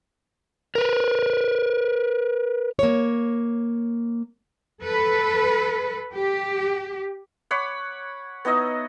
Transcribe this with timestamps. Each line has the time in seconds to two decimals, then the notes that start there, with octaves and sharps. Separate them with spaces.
0.75 A#4 B4
2.79 A#3 C#5
4.82 A4 B4
6.14 G4
7.51 C#5 F#5 B5 D6
8.45 B3 D#4 E4 D#5